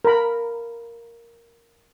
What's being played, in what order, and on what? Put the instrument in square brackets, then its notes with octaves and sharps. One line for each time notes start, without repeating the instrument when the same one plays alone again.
[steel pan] A#4 B5